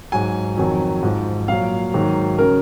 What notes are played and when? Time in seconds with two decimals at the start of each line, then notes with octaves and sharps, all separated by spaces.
0.12 G#2 F#3 G#5
0.57 F2 D#3 F#3
1.03 G#2 F3
1.48 A#2 F#3 F5
1.94 G#2 D#3 F#3
2.38 C#3 F#3 A#4